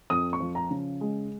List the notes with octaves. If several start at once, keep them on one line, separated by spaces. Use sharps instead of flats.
F2 D#6
C#6
F3
A#5
C#3
G#3